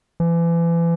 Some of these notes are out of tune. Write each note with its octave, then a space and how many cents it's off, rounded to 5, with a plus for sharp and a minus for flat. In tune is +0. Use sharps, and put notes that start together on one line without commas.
E3 +35